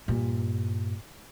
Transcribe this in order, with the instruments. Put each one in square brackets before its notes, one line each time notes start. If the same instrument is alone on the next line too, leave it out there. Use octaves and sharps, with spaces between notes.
[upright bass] G2 A#2